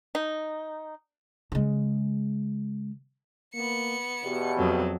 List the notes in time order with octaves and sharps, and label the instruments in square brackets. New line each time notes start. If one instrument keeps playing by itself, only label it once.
[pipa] D#4
[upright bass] C#3 G#3
[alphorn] A#3 [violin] B3 C#7
[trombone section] E2 B2 [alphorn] G4
[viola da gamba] F2 F#3